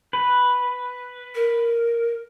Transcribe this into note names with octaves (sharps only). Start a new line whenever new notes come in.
B4
A#4